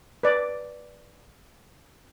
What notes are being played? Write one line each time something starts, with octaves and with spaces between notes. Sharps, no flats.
B4 D5